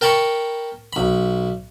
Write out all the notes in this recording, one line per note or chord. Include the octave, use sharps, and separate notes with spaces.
A#4 G5 A5 B5 C#6
B1 B5